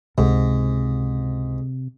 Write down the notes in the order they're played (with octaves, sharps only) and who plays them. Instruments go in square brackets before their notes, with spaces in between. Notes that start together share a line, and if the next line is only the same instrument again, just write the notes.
[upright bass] C#2 [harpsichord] G#2 [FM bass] C3